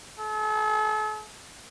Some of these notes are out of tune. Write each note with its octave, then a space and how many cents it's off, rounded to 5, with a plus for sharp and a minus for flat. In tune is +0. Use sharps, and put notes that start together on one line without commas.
A4 -45